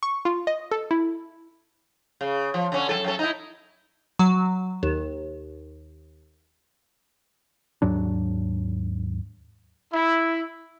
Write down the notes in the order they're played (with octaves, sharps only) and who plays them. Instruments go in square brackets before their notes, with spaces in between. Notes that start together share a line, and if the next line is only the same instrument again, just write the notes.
[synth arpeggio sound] C#6
F4
D#5
A4
E4
[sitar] C#3
F3
D3 C#4
F#2 D#3 A4
F#2 C#4 A4
D#4 E4
[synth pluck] F#3
D#2
[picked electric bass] D#2 G#2 F#3 D4
[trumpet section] E4